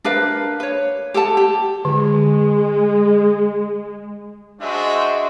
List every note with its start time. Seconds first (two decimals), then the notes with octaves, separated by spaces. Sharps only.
0.04 D4 A#4 B4 F5
0.60 B4 C#5
1.14 G4 A4 F#5 A5
1.37 G4
1.85 D3 G#3
4.61 G#3 D4 F#4 C5 E5